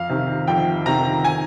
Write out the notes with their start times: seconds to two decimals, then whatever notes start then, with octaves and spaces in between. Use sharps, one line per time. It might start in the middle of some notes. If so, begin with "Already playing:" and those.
Already playing: F2 F5
0.09 C3 D#3
0.47 F2 G5
0.86 C3 D#3 A#5
1.24 G#5